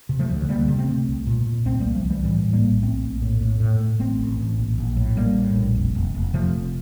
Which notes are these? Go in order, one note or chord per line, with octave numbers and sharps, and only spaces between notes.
C3
F3 A3
D2
D2 G3 A#3
C3
A3 C4
C3
C2
A#2
A#2
C2 A3 C4
C2 G3 A#3
F3 A3
C2
E3 G3
A2 E3 G3
A2
G3 A#3
A#1
A#1 A3 C4
A#1
A2
A2
A2
A2
A1 A3 C4
A1
A1
A#1
A#1
A2
A#1 G3 A#3
A2
A#1
F1
F1
F1
C3 F3 A3
F1